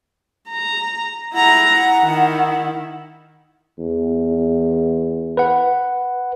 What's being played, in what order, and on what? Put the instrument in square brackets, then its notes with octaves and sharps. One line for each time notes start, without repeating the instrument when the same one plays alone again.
[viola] A#5
[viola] E4 A#5 [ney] F#5
[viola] D#3 E4
[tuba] E2
[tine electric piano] B4 F#5